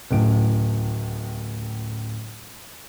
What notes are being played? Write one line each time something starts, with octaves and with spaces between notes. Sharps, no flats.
D1 C#2 A2 D7